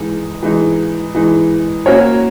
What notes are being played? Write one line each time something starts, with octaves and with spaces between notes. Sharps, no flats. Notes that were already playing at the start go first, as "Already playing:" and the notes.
Already playing: E3 G#3 D#4
E3 G#3 D#4
E3 G#3 D#4
A#3 C#4 F#4 A#4 C#5